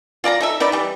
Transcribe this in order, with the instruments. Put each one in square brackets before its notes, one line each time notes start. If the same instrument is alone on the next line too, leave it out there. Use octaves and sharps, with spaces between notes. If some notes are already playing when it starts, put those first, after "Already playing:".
[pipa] F4 D5 A5 A#5
D#4 A4 E5
D#4 E4 B4 D5
E3 G3